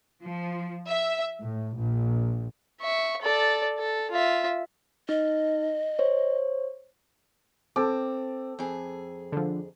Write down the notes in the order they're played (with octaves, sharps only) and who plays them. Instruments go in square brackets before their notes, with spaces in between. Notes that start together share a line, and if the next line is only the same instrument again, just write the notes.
[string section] F3
E5
A2
A#1
[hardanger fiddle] E5 C#6
A4 D5
A4
F4 E5
[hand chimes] D#4 [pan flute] D#5
[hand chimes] C5 C#5
[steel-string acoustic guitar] C4 [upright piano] A4 A5 D6
[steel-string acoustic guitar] F2 G#4
[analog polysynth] D3 F3